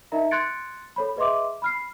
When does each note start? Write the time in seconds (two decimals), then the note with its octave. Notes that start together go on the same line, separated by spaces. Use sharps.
0.12 D#4 A#4 D#5 E5 A#5
0.31 C6 F#6 G#6 A6 C#7 D7
0.96 A4 C#5 B5
1.16 G#4 B4 D#5 E5 C6 D6
1.62 B5 F6 C7